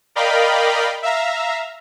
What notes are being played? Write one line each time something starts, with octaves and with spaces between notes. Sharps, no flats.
A#4 D5 D#5 F5 G5 B5
E5 F5 A#5